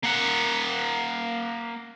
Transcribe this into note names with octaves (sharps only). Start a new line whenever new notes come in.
A#3 F#5